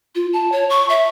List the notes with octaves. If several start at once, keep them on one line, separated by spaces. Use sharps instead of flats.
F4
A5
C#5
C#6
E5